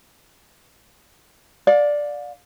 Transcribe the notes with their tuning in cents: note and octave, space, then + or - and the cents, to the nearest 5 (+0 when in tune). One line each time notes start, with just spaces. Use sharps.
D5 +0 F5 +40